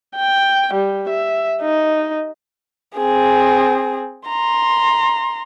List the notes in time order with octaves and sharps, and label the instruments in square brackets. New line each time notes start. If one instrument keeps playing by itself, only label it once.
[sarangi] G5
G3
E5
D#4
[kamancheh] C4 G#4
A#5 C6